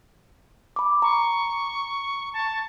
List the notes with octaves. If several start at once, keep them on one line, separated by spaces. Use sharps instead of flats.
B5 D6
A#5 C#6
A5